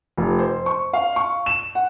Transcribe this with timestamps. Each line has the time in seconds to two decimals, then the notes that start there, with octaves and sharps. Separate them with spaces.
0.17 F1
0.39 C5
0.66 C#6
0.93 F5
1.16 C#6
1.46 E7
1.75 F#5